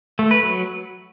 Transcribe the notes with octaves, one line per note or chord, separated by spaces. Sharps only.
A3
B4
F#3